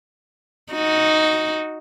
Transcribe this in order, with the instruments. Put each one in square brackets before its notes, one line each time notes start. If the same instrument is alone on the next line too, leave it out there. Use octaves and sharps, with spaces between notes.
[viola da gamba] D#4 F#4